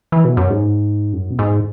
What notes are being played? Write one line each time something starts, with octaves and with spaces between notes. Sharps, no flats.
E3
B2
F#2
G#2
F#2
B2
G#2